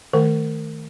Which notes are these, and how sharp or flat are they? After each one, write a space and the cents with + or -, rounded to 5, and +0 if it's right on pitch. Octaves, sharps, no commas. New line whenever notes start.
D#3 +10 A3 +0 A#4 -30